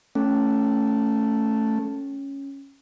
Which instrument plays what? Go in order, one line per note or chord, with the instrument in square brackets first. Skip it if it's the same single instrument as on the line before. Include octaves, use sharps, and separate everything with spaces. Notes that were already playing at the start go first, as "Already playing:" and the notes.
[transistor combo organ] A3 [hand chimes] C#4